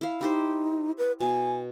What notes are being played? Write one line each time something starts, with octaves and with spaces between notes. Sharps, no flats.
E4 F5
D#4 E4 G4 C5
B4
B2 G#5